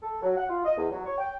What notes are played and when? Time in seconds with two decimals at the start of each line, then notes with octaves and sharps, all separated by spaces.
0.02 A4
0.22 F#3
0.37 F#5
0.49 F4
0.65 D#5
0.78 E2
0.91 F#3
1.05 C#5
1.18 G5